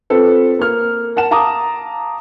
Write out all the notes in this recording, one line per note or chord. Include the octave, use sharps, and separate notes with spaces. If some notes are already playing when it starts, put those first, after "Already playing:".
C4 F4 A4 B4
A#3 F6
A#4 F#5 A5 E7
F5 A5 A#5 D6 D#6